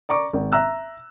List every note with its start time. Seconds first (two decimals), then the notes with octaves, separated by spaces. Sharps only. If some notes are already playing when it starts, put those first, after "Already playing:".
0.09 D5 A#5 C#6 D6
0.33 G#1
0.52 E5 A#5 E6 F#6